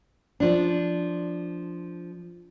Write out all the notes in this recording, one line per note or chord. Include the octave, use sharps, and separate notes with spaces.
F3 D4